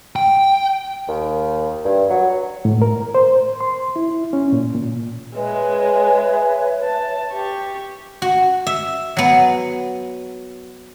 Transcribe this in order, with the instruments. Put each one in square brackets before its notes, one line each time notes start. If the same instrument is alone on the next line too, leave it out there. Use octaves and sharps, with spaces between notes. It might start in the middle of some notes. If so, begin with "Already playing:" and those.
[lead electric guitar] G5
[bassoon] D#2
G2
F#3
[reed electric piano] A2
A#4
C5
C6
E4
C#4
A#2
A#2
[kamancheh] G#3 G#4 [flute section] B4 C#5 E5
[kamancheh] A5
G4 C#6
[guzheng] F#4
E5
F#3 B3